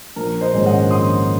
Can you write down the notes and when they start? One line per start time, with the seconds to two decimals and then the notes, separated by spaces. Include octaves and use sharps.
0.16 A#1 A#4
0.41 C5 D#5
0.53 G#2 D#3 G#3 C#4
0.66 D#5 F#5
0.91 A#1 C6 D#6